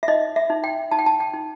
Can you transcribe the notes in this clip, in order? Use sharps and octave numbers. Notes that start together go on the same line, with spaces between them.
E5
D#4 D#5
E5
D#4
G5
D#4 A5
G5
A5
G5
D#4